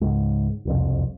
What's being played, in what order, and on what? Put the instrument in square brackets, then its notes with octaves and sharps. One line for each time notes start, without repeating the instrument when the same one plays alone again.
[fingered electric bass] C#2 G#2
E1 C2 F2